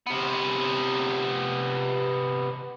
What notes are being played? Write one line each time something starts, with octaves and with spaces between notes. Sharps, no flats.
C3 B3